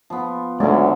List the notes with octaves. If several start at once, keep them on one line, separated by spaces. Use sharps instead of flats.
F3 B3
D2 F#3 G#3 A3